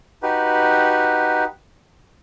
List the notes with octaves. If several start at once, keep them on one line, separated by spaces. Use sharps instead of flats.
D#4 F#4 G4 B4